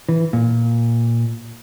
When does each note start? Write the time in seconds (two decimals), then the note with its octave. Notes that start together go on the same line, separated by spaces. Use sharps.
0.09 E3
0.33 A#2